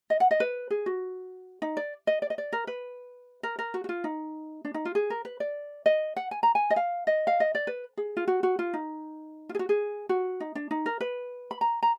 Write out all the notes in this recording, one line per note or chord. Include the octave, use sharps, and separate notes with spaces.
D#5
F#5
D#5
B4
G#4
F#4
D#4
D5
D#5
D5
D#5
D5
A#4
B4
A#4
A#4
F#4
F#4
F4
D#4
D4
D#4
F4
G#4
A#4
B4
D5
D#5
F#5
G#5
A#5
G#5
D#5
F5
D#5
F5
D#5
D5
B4
G#4
F4
F#4
F#4
F4
D#4
F4
G#4
F#4
G#4
F#4
D#4
D4
D#4
A#4
B4
B5
A#5
A#5